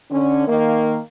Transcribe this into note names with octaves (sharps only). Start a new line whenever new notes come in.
D3 C#4
D#3 A#3